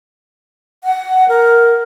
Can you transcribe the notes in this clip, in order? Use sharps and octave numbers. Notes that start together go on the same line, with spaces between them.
F#5
A#4